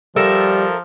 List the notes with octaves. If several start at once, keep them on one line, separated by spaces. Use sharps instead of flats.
F3 G3 A4 A#4 E5